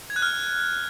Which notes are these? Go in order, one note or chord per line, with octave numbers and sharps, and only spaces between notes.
G#6
F#6
F6